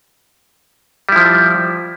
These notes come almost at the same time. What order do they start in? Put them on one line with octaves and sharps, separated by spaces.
G3 E4 F3